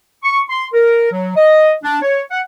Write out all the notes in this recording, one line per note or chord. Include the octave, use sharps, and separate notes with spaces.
C#6
C6
A#4
F#3
D#5
D4
C#5
F#5